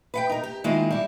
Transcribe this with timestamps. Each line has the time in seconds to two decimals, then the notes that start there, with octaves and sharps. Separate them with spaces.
0.14 B4 F#5 G5
0.29 D#4 A#4
0.44 G4
0.64 D#3 G#3 A#3 E4 F4
0.91 G3 E4